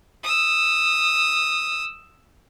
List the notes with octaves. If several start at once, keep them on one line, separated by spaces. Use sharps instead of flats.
D#6 E6